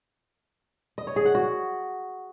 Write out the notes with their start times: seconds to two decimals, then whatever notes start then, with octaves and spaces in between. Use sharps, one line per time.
0.98 D#5
1.07 C#5
1.16 G#4
1.25 F#5
1.35 F#4